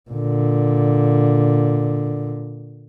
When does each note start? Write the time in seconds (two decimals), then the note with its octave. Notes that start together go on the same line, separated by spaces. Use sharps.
0.10 A#2 D3